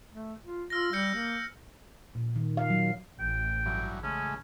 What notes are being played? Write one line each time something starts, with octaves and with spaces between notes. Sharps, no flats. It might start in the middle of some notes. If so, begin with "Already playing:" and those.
A3
F4
F4 E6 F6 A#6
G3 E6 G6 C#7
A#3
A#2
D#3
F5
F#3
A1 G5
G2 E3 F#3
C#3 G#3 A3 C#4